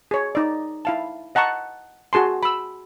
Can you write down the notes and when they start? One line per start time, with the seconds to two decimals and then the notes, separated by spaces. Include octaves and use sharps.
0.11 G#4 C#5
0.35 D#4 D5
0.85 E4 F5 A5
1.35 D#5 F#5 A5 A#5 C#6
2.13 F#4 G#4 A5 C6
2.43 B5 E6